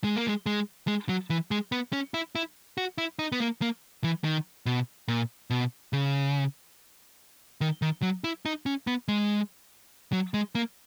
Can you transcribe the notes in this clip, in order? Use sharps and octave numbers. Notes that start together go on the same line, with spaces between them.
G#3
A#3
G#3
G#3
G#3
F#3
E3
G#3
B3
C#4
E4
E4
F#4
E4
D#4
B3
A#3
A#3
E3
D#3
B2
A#2
B2
C#3
D#3
D#3
F#3
E4
D#4
C#4
B3
G#3
F#3
G#3
A#3